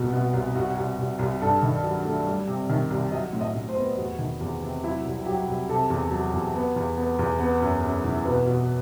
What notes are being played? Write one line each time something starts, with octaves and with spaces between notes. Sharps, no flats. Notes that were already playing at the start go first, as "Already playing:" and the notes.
Already playing: C2 B2 F#4
B2
C2
C2 F#4
C2
C2
C2
G2 A4
D#3
F#3
A3
G3
C3
D#3
C2
F#3 D#5
A2
D#5
A2
C5
B3
E2 F#4
D#3
E2
C3
F#3 E4
C2
F#3 G4
C2
C3 A4
E2
F#3
E2
B3
E2
B3
E2
B3
F#2
F#2
E3
B2 B4
B2